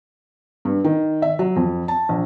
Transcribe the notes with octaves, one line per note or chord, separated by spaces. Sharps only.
G2
D#3
E5
F#3
F2
A5
A#1